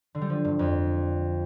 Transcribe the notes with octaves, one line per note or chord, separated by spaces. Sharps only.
D3
G3
F3
G2
F2